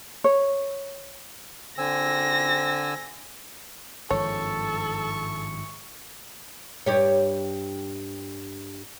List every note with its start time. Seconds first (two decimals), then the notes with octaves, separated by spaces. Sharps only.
0.24 C#5
1.78 D3 C4 G#5 E6 A#6
4.10 G#1 G2 F3 G#4 A4 C#5 E5 C#6
6.86 G2 G4 C#5